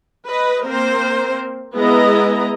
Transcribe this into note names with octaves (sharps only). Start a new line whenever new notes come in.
B4 D#5
A#3 C4 A#4 C5
G#3 B3 E4 G#4 D#5 A#5